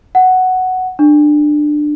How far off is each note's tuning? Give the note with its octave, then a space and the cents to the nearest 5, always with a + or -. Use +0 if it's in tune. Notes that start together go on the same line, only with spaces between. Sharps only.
F#5 +5
D4 +20